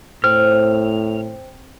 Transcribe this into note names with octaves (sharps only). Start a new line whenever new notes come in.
A2 C4 F6